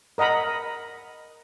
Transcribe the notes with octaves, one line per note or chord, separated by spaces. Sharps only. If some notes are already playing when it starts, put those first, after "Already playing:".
A#4 D#5 F#5 A#5 B5